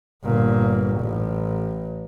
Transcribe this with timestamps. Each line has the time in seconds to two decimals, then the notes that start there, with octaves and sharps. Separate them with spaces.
0.25 G1 A#2
1.00 A1